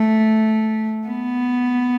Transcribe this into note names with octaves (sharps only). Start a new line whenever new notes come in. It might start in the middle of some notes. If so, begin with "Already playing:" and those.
Already playing: A3
B3